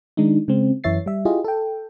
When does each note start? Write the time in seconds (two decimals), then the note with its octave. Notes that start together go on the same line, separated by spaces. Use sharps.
0.17 D#3 G#3 D4 D#4
0.48 C#3 G#3 C4
0.84 F#2 E3 C#5 E5 A6 C7
1.06 G3 E5
1.25 E4 F4 G4 G#4 D#5
1.44 A4 G5